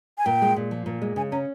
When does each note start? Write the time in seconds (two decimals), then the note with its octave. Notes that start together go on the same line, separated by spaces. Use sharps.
0.18 G#5
0.26 A#2 G5
0.42 G#3
0.56 A#2
0.71 F3
0.86 A#2
1.02 G#3
1.16 C#3 G#5
1.32 C#4 A#5